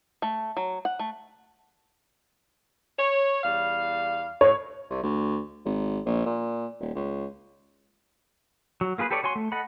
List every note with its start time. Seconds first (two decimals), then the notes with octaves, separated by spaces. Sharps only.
0.22 A3
0.57 F#3
0.85 F#5
0.99 A3
2.98 C#5
3.43 E2 G3 F5
4.41 A2 C#5
4.90 C2
5.03 D2
5.65 G#1
6.06 A#1
6.25 A#2
6.80 D#1
6.95 C#2
8.81 F#3
8.98 A#3 F4 G#4 B4
9.10 G4 A4 B4 C#5 D5
9.23 F#4 C#5 G#5 C6
9.36 A3
9.52 A4 D#5 F#5 B5